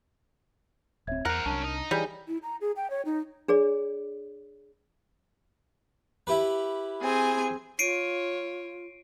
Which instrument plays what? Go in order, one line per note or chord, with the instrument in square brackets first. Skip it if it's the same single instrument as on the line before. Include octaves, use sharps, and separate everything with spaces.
[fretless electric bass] D1 C4 [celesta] C#5 E5 G#6
[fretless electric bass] E2 [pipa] A#4 [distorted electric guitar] C5 F#5 [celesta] F#6 F7
[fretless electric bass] C2 [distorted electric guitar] F#3 C#4 [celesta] D4 A5
[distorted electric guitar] D#4
[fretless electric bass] E3 [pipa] G3 [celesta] G#4 C#5 G#5
[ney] E4
A#5
G#4
G5
C#5
D#4
[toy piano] D4 G#4 C#5 D5
[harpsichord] E4 G4 B4
[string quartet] C4 G#4 G#5
[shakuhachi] F4 [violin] C#5 [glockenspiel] C7 D7 D#7